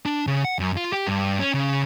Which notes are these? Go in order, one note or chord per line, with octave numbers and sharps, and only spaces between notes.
D4
C#3
F#5
F#2
F4
G4
G2
C#4
C#3